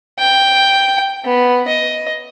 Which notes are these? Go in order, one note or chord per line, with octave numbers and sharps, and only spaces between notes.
G5
B3
D#5